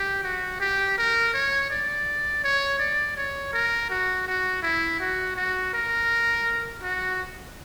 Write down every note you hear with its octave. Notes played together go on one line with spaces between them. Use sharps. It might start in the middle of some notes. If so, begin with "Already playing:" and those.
Already playing: G4
F#4
G4
A#4
C#5
D5
C#5
D5
C#5
A#4
F#4
F#4
E4
F#4
F#4
A#4
F#4